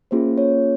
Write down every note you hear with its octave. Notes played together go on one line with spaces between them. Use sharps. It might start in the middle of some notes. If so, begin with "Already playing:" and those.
A#3 C#4 F4 G#4 C5
C#5